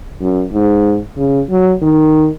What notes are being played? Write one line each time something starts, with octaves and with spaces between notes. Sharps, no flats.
F#2
G#2
C#3
F#3
D#3